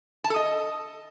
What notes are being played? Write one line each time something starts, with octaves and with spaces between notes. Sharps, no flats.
A5
A4
D#5